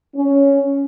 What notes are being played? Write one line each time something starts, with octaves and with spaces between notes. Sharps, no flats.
C#4